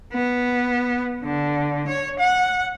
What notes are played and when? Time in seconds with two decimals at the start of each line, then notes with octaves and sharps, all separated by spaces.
0.13 B3
1.24 D3
1.87 C#5
2.19 F#5